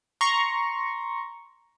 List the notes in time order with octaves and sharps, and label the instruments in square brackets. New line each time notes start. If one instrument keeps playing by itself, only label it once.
[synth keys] A#5 C6 C#6